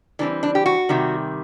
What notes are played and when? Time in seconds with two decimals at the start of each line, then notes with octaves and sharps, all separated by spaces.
0.19 E3 G3 C4 D4
0.43 D4
0.55 G4
0.66 F#4
0.89 C3 D#3 G3